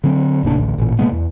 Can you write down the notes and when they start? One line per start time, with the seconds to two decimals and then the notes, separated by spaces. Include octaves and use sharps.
0.04 D3 F#3 C4
0.43 F1 A#2 C#3 D4
0.56 A1 D2
0.78 A1 A#2
0.99 B2 G#3 A#3 B3
1.12 E2